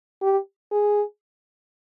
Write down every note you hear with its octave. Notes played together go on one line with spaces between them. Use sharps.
G4
G#4